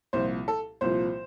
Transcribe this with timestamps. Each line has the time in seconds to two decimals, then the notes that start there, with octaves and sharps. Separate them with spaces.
0.13 C2 A#2 F3 C5
0.48 A4
0.81 C2 A#2 F3 C5